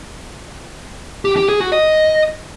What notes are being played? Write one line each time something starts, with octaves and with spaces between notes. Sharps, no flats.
G4
G4
G#4
F#4
D#5